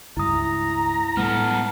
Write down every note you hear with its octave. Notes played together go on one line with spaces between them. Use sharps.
C#2 G2 E4 A#5 D#6
A2 G3 G#3 B3 A4 F6